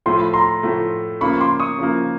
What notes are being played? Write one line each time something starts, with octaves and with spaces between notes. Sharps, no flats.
A2 F3 A3 C6
B5
A#5 C6
A2 F3 A3
C#3 F3 A#3 B5 C#6
C6 D6
C#6 D#6
C#3 F3 A#3